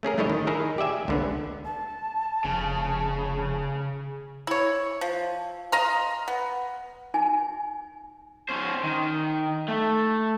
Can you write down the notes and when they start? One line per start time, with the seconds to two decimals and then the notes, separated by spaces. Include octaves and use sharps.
0.03 A3 C#4 G#4 A#4
0.17 G3 A3 D4 E4 C#5 D#5
0.30 D#3
0.47 D#4 E4 G#4 A#4 E5
0.78 G4 D5 E5 G#5
1.08 C#2 D3 B3
1.65 A5
2.44 F1 C#3
4.47 E4 C#5
5.01 F3
5.72 D#5 F5 A#5 C6
6.28 B3
7.14 D#4 G#5
8.49 C#4 C5
8.83 D#3
9.69 A3